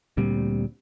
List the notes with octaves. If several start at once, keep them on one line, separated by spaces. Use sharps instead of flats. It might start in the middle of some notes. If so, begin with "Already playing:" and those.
D2 A#2 G3 C4